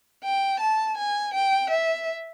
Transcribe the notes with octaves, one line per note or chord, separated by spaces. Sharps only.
G5
A5
G#5
G5
E5